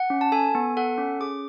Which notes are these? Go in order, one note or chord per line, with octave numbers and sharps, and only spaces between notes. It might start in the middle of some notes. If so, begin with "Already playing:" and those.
Already playing: F#5
C#4
A5
A4 G#5
B3
A4 F#5
C#4
G#4 D6